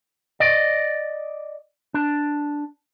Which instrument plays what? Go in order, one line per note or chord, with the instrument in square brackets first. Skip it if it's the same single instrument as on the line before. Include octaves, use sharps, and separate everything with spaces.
[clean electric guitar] D5 D#5
D4